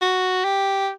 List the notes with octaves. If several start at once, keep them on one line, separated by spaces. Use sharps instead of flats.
F#4
G4